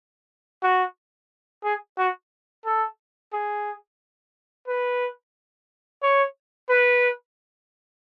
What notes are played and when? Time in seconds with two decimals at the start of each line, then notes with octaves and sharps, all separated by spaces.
0.63 F#4
1.64 G#4
1.98 F#4
2.65 A4
3.33 G#4
4.67 B4
6.03 C#5
6.69 B4